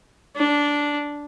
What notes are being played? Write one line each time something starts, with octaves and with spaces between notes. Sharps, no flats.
D4